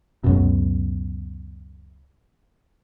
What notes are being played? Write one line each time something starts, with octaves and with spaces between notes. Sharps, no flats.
C#2 F#2 B2